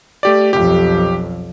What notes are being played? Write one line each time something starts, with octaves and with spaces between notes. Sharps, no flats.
A3 G4 D5
B1 F2 G4